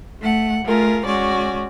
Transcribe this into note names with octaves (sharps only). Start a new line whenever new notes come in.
A3 F#5
A3 F4 G#4 A#4
G#3 C#4 F#4 D5